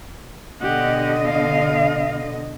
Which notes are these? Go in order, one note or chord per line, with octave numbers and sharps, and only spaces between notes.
B2 D3 G4 D#5 F#5
F5